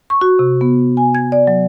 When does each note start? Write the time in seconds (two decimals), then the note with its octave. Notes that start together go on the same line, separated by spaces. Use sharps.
0.10 C#6
0.21 F#4
0.39 C3
0.61 B3
0.97 G#5
1.15 G#6
1.32 D5
1.47 F#3